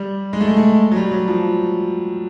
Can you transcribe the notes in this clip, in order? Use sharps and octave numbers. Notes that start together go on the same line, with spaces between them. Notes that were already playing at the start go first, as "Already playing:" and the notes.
Already playing: G3
G#3
A3
G#3
A3
F#3
G3
F#3
F3